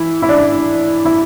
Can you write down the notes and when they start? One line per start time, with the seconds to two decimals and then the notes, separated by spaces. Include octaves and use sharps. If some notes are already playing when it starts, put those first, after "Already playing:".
Already playing: E3 E4
0.22 E4
0.29 D4
1.05 E4